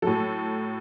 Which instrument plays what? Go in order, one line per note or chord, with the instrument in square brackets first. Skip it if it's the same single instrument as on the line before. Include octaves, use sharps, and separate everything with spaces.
[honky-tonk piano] A2 F#3 A4